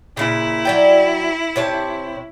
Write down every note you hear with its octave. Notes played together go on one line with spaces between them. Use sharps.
A#2 C#3 E4
F#3 D5 G5
C3 C#5 A5